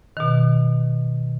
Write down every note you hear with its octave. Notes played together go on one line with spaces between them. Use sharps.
B2 D#3